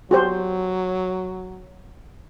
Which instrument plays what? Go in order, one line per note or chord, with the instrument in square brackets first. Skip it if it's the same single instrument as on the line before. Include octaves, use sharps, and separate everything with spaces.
[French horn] F#3 [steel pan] F#4 G4 C5